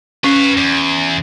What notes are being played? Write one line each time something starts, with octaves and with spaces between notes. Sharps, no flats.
C#4 B4 F5
E2